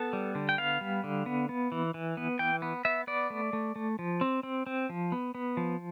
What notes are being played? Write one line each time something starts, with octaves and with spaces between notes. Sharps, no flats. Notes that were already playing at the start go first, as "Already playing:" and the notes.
Already playing: B3 A4
G3
D3
G5
B3 F5
G3
D3
B3
B3
E3
E3
B3
E3 G5
B3
B3 E5
B3 D5
A3
A3
A3
F3
C4
C4
C4
F3
B3
B3
F3